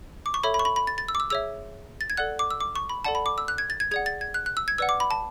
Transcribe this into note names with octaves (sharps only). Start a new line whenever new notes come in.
D6
C#6
A4 C#5 E5 B5
B5
C#6
B5
B5
A6
A6
E6
D6
E6
G#4 C#5 E5 E6
A6
G#6
A4 D5 F#5 F#6
D6
E6
D6
C#6
B5
A4 D5 F#5 A5
B5
D6
E6
F#6
G#6
A6
G#6
G#4 D5 F#5 G#6
A6
G#6
F#6
F#6
E6
G#6
B4 D5 F#5 E6
D6
B5
A5